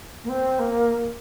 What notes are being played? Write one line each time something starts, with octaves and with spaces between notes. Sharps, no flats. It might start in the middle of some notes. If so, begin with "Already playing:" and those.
A#3
C4
A#3